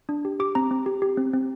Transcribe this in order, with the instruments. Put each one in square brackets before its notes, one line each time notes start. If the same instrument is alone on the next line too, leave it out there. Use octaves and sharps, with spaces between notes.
[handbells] D4
G4
G4 D6
C4 A#5
C4
G4
G4
C4
C4